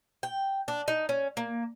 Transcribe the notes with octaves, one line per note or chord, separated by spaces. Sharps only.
G5
D4
D#4
C#4
A#3